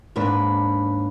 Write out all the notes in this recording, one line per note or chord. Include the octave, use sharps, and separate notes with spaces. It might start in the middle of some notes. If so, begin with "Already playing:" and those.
D#2 G#2 D4 B4